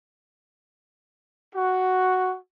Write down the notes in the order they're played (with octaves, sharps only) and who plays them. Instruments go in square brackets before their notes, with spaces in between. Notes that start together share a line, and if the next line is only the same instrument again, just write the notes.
[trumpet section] F#4